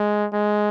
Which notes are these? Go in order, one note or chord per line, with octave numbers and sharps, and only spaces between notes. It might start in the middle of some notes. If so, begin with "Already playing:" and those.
Already playing: G#3
G#3